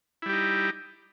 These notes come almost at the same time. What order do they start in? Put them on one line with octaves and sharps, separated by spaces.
E4 G3 G4 D#4